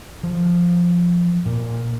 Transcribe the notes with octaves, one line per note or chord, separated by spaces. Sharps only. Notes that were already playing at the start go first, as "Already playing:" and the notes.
F3
A#2